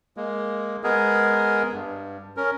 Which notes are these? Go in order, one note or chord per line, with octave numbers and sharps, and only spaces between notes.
G#3 A#3
G#3 B3 G#4 A#4
G2
C#4 A#4